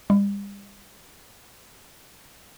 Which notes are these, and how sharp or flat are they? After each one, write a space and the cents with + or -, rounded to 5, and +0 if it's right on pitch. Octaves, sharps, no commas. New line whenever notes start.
G3 +40